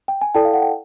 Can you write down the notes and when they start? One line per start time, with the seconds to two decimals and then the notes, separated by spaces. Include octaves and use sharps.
0.08 G5
0.21 G#5
0.34 E4 A4 D5 G5 A5
0.45 F5
0.54 F#5
0.62 G5